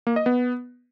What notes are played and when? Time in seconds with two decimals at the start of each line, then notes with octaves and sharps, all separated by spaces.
0.07 A#3
0.16 D#5
0.26 B3